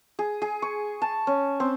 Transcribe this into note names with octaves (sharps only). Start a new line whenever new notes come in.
G#4
G#4
C#6
A5
C#4
C4